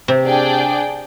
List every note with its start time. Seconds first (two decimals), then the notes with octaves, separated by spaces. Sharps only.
0.08 C3
0.24 D4 G#4 D5 G5